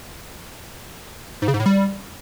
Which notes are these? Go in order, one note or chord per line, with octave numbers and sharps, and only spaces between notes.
G#2
C#3
G#2
A2
G3